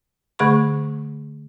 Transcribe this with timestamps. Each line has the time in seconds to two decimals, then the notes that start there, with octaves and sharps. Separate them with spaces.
0.39 D3 A3 G#4 B5 C#6